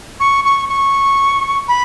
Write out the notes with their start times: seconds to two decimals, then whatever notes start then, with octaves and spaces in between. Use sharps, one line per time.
0.20 C#6
0.45 C#6
0.69 C#6
1.68 B5